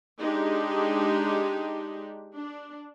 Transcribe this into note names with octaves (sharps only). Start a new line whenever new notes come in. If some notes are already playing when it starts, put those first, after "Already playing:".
G#3 D4 D#4 G4
D4